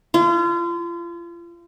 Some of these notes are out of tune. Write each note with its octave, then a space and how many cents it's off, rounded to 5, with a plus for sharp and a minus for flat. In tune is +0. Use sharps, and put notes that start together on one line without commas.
F4 -35